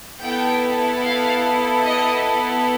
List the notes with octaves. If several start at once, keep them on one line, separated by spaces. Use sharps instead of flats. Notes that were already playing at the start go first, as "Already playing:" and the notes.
B3 E4 A4 G5
F5
D#5